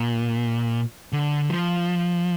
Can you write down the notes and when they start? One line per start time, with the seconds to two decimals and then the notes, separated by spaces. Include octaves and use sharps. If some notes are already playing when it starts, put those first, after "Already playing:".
Already playing: A#2
1.13 D3
1.50 F3